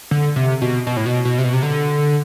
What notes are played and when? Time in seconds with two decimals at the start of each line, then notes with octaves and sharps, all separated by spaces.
0.11 D3
0.36 C3
0.62 B2
0.87 B2
0.97 A2
1.06 B2
1.25 B2
1.38 C3
1.44 B2
1.53 C3
1.63 D3